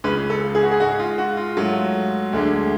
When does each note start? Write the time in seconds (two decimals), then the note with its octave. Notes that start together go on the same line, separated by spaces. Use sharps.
0.04 C#2 C#3 G#3 B4
0.30 A4
0.55 G#4
0.63 F#4
0.72 G#4
0.80 G#2 G#3 F#4
1.00 F4
1.18 F#4
1.37 F4
1.57 G#2 F#3 A3
2.33 D2 D3 G#3